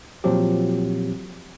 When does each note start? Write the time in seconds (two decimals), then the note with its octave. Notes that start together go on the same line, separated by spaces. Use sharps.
0.24 A#2 F3 F#3 C4 G4